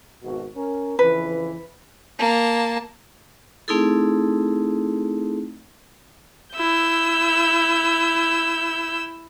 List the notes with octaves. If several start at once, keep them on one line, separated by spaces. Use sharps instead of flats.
G#1 B2 F#4
C#4 A#4
F2 C#3 E3 B4
A#3 A5
A3 C4 D#4 E4 G#4 A4
E4 E6 G6